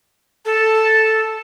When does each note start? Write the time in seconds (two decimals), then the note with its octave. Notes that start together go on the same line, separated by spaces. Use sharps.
0.45 A4